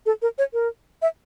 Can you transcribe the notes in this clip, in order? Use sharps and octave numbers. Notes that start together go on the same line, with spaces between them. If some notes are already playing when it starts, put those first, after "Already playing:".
A4
A#4
C#5
A#4
E5